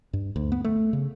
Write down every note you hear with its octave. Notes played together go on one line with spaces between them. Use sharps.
G2
D2
B3
A3
C#3